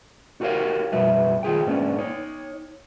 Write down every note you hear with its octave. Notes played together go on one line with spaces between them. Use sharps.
D#4 F#4 G4 A#4 C#5 F5
F#2 B2 G3 F#4 B4 E5
D#3 F4 G#4 G5
G#2 G#3 A#3 B3 C#4 D4
D#4 C#5